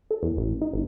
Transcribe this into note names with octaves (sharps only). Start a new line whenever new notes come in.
A4
E2
A1
D#4
G1